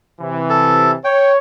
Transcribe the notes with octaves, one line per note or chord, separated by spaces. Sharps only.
C3 E3
A4
C#5 G5